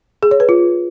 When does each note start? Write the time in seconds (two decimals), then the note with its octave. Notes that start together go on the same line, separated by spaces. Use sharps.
0.23 G#4
0.31 C#5
0.40 B4
0.49 F4